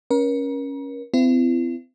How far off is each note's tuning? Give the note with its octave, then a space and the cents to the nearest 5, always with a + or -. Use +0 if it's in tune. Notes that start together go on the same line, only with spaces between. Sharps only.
C#4 +0 A#4 +35
C4 -40 E4 +40